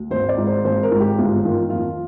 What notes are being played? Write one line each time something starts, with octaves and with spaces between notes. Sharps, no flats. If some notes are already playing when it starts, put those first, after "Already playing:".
Already playing: D2
G#1 C5
D5
G#2
C5
G#1 C5
A#4
G#2
G4
G1 F4
D#3 F4
F2 F4